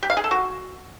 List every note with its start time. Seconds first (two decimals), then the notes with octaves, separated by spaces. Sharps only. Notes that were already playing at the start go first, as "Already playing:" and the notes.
0.03 G4
0.10 F5
0.17 G#4
0.24 A4
0.31 F#4